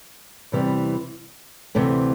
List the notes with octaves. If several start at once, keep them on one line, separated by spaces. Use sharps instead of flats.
E2 C3 E3 G3
D2 C3 E3 A3 C4